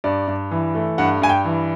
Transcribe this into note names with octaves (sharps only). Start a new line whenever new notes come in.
G2 D5
G2
E3
A3
G2 F#5
G2 G#5
G5
E3